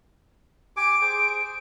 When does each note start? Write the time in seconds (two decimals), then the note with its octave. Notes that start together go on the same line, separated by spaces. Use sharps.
0.77 G4 G#5 D6 D7
1.02 G#4 C5